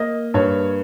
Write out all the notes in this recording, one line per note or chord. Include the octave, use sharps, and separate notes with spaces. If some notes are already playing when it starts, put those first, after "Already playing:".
Already playing: A#3 D#5
G2 C#5